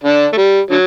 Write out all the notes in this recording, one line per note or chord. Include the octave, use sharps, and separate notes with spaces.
D3 D4
A3
G3
D3 F#3